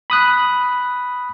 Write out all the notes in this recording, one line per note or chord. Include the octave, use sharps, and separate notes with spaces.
B5 D#6 F#6